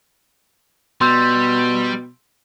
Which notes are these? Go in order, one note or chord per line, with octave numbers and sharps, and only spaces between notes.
B2 G3 C6 E6 G6